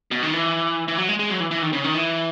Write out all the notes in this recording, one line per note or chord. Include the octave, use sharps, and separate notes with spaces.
B2
D#3
E3
E3
F#3
G#3
G#3
F#3
E3
E3
D#3
C#3
D#3
E3